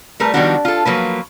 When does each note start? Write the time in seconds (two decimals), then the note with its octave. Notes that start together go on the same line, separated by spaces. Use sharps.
0.20 G3 A3 A#4 B4
0.34 D#3 F3 G3 B3 D4 F#4
0.65 F4 A4
0.85 F3 F#3 A#3 B4